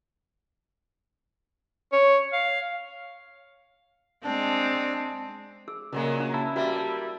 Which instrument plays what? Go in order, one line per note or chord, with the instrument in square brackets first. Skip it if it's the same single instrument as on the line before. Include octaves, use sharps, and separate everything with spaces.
[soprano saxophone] C#5
F5
[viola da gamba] G#3 C4 [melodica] D4
[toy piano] G#4 E6
[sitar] A#2 F#3 G#3 [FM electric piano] C#3 A#3
[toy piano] C#4
[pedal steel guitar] E4 [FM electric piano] A5
[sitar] G3 A#3 [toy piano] F#4 B4 E5